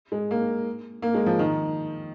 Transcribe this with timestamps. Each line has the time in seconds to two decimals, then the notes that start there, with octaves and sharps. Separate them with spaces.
0.12 G#3
0.31 A#3
1.02 A#3
1.14 G#3
1.26 F3
1.39 D#3